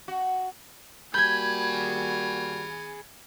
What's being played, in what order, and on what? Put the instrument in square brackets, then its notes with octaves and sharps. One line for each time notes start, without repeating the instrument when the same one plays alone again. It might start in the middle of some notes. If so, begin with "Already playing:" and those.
[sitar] F#4
[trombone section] G3 A#3 F#4 [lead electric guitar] G#4 B5 [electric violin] G#5 [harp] G6 G#6